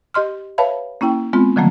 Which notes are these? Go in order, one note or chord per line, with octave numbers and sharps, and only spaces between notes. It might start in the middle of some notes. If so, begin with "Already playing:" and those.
G4 D#5 C6 F6
B4 C#5 E5 F5 A5 B5
A#3 C#4 E4 G5
G#3 B3 C4 F4
D3 D#3 F3 F#3 A3 A#3